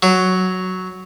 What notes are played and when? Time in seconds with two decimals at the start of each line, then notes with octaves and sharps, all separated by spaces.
0.03 F#3